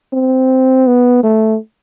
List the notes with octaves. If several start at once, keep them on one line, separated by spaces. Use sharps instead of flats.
C4
B3
A3